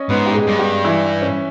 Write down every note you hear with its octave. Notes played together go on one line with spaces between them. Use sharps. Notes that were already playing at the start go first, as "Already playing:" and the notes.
Already playing: C#4 C#5 D#5
G#2 B3 B4
G4
G#3 G#4
G2
G3 G4
E3 E4
C#4